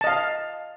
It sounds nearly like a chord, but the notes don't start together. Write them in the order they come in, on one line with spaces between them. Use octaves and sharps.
A5 D#5 F5